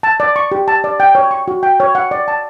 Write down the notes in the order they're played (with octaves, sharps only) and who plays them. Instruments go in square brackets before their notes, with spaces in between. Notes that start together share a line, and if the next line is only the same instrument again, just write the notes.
[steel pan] A5
D5
C#6
G4
A5
D5
G5
C#5
C#6
F#4
G5
C#5
F#5
D5
A5